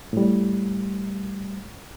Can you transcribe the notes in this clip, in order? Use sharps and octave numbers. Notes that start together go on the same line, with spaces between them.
A2 G3